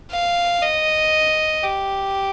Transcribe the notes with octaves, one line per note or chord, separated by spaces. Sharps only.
F5
D#5
G4